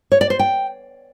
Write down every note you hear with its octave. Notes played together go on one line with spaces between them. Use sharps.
C#5
D5
C5
G5